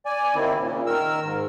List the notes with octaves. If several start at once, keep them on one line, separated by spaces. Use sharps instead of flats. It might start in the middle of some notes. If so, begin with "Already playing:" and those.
D5 G#5
D#2 D#3 C4 E4
A#2 C#3
D#3 A#4 E6
G#2